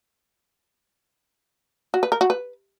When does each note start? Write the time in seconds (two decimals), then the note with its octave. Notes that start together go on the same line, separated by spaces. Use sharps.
1.94 F#4
2.03 B4
2.12 A#4
2.21 F#4
2.30 B4